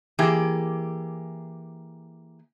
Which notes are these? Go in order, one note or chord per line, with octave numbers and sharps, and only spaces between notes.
E3 A#3 G4 G#4